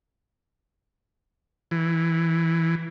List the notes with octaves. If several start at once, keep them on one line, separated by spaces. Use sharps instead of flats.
E3